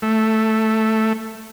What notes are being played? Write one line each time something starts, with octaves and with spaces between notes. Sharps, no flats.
A3